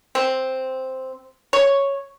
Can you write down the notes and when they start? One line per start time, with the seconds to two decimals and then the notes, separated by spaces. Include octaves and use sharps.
0.15 C4
1.53 C#5